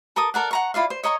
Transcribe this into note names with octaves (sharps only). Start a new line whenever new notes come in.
A4 A#4 D6 D#6
A4 A#4 D5 F#5
F#5 A#5 C#6
E4 F4 D5 F5
C5
C#5 D#5 A#5 C#6